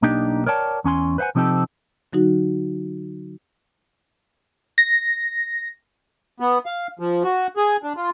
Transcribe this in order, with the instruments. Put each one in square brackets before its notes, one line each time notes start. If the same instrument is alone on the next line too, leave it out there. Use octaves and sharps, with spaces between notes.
[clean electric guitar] B1 A#3 D4 D#4 G4
A#4 C#5 D5 G5 A5
E2 C#4 G#5 C6
B4 C5 F5 F#5 G#5
C3 F3 C4 D#4 G4 A4
[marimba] D3 F#3 D#4 F#4
[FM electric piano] A#6
[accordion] B3
F5
F3
F#4
G#4
D4
F4